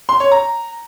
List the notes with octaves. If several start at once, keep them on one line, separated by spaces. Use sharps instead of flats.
C6
C#5
A#5